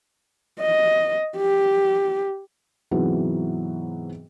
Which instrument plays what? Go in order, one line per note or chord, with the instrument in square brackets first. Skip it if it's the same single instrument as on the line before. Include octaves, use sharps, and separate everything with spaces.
[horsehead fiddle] D#5
G4
[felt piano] G#2 C3 E3 F#3 B3 F#4